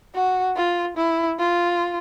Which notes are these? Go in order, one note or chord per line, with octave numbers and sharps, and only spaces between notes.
F#4
F4
E4
F4